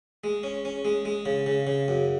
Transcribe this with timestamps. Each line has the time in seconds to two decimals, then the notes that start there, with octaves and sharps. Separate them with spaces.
0.24 G#3
0.43 C#4
0.65 C#4
0.85 G#3
1.05 G#3
1.26 C#3
1.46 C#3
1.67 C#3
1.88 F#2